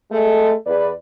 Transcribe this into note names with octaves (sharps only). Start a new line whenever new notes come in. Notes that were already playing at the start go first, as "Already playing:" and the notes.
G#3 A3
E2 B4 D5